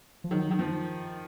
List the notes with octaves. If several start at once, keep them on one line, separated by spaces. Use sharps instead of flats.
F3
D#3 F#3
D#3
F3